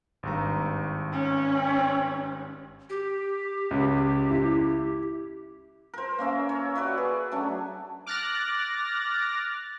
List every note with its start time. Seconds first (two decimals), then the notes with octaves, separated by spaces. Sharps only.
0.23 G#1 G2 A#5
1.13 C#4
2.90 G4
3.71 C#2
4.31 E4
5.94 A#4 C5
6.19 A#3 C#4 E5 F5
6.49 C#5
6.75 F#4 B4 D5 E5
6.98 G#4
7.32 F#3 A3 C#4 D4
8.06 D6 F6 F#6 A6 A#6